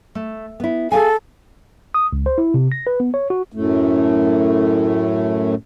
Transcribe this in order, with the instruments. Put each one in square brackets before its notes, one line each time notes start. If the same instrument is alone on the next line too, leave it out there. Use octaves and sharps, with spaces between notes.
[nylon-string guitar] A3
B3 E4
[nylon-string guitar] G#4 F5 G#5 [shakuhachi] A4
[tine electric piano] D#6
C#2
C5
E4
C3
A#6
B4
B3
C#5
F#4
[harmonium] F#2 A2 A3